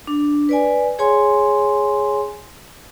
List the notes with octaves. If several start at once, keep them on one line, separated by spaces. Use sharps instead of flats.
D4
B4 D5 G#5
G#4 C#5 G#5 C6